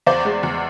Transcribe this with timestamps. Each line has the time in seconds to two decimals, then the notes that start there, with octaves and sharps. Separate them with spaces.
0.07 E2 C5 D5
0.25 G#3
0.43 E2